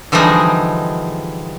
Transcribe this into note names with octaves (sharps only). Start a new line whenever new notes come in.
D3 E3 F3 G3 G#3 D#4